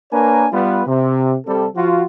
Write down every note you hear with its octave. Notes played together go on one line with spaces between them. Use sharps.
A#3 D4 A#4 B4 C#5 G#5
G3 B3 F4 B4
C3
C3 G3 A4
F3 F4 F#4